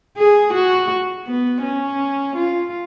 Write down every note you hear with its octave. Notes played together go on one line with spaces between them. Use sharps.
G#4
F#4
B3
C#4
F4